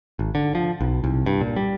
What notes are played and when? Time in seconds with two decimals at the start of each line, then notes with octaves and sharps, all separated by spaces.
0.19 G#1
0.35 D3
0.55 F3
0.81 B1
1.04 C2
1.26 G2
1.41 A#2
1.56 G3